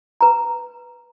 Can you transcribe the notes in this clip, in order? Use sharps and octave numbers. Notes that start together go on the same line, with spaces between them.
B4 A#5